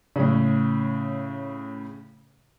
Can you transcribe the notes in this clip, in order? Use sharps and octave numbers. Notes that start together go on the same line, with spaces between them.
A2 C#3